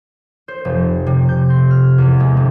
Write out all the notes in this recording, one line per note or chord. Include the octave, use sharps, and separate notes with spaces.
C5
F1
C3
G6
C6
F6
E2
G#3
G1